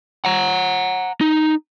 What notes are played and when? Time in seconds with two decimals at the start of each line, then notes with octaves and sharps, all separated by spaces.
0.25 F#5 A#5
1.21 D#4